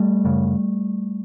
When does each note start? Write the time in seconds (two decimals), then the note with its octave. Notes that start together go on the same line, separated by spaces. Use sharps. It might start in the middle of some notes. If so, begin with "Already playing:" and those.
Already playing: G3 A3
0.25 F#2 C#3